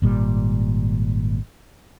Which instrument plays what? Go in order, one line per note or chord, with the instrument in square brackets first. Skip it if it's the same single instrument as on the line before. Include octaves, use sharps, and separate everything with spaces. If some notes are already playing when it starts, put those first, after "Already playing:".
[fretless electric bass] G#1 A#2 G3